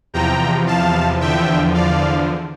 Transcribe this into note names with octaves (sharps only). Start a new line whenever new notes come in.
E2 C3 F3 G5 A#5
F5 A5
E2 D3 F3 E5 G5
D5 F5